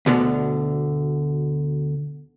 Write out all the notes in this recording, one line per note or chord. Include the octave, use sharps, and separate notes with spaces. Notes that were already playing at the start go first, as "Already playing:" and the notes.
D2 B2 D3